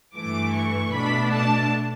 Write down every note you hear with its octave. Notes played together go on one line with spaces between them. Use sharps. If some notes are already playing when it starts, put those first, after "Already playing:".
G2 E3 A3 D6
C#6
B2 A3 D4 B5
A5